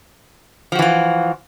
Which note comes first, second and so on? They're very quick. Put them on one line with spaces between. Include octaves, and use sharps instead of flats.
F3 F#4 E3 F4